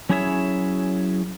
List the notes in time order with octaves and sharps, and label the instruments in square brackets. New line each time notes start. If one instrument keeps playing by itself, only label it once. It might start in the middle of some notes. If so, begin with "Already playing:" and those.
[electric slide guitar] F#3 C#4 E4 G#4 C#5 E5